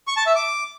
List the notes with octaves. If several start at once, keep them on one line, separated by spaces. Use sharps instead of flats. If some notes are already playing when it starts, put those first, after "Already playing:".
C#6
A5
E5
D6